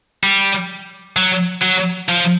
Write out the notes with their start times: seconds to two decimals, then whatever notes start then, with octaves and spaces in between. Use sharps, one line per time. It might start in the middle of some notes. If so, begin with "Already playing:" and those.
0.23 G3
1.17 F#3
1.62 F#3
2.09 F3